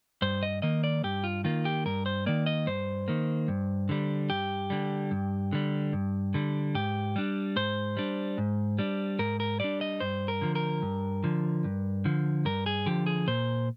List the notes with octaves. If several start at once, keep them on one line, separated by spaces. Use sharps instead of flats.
G2 C5
D#5
D#3 A#3 D#5
D5
G2 G4
F4
D#3 A#3 F4
G4
G2 A#4
C5
D#3 A#3 D5
D#5
G2 C5
D#3 A#3
G2
D3 G3
G2 G4
D3 G3
G2
D3 G3
G2
D3 G3
G#2 G4
G3 D4
G#2 C5
G3 D4
G#2
G3 D4
G#2 A#4
A#4
G3 D4 D5
D#5
G2 C5
A#4
D3 F3
A#4
G2
D3 F3
G2
D3 F3
G2 A#4
G#4
D3 F3 G4
G#4
A#2 C5